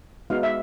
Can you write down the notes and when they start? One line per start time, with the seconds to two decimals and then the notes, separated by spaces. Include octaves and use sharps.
0.30 G#3 B3 D#4 F#4 F5
0.43 E5